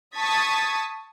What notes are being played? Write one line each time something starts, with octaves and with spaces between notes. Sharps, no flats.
A5 C#6 D#6 G#6 A6 B6